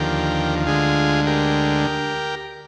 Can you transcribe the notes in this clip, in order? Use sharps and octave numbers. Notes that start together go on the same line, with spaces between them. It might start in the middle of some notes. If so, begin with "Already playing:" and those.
Already playing: D#2 D3 F3 G4 A#4
D2 D3 G#3 F4 G#4
G4 A#4